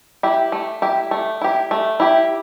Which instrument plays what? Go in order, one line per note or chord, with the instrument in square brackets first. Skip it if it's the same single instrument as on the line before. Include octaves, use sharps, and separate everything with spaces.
[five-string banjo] E4 G4
A3
E4 G4
A3
E4 G4
A3
E4 G4